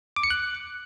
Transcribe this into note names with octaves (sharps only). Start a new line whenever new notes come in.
D6
C#7
F#6